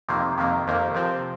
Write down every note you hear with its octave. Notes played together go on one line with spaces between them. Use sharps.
F2 C3 D#3 A#3
F2 C3 D#3 A#3
F2 C3 D#3 A#3
C3 F3 C4